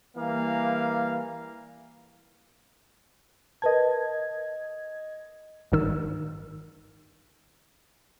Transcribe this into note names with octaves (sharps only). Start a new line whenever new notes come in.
E3 G3 A#3 F5
A#4 B4 D#5 A5 G#6
G#1 G2 D#3 E6